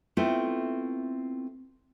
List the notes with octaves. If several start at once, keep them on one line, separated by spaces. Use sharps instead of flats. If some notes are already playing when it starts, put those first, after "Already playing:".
A3 B3 C4 E4 F4 A4